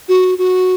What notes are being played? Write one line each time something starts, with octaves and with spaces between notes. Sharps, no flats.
F#4
F#4